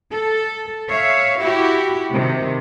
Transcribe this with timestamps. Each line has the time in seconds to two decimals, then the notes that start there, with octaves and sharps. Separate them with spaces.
0.12 A4
0.90 C#5 E5 F5
1.39 E4 F#4 G4
2.11 C3 D#3